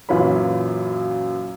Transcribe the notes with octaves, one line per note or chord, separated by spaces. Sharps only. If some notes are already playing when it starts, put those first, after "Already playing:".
F#2 A#2 E3 F4 C#5 B5